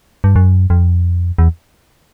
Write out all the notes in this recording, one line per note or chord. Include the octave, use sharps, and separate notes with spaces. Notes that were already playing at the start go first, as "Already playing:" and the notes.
G2
F#2
F2
E2